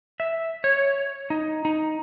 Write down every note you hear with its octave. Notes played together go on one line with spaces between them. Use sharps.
E5
C#5
D#4
D#4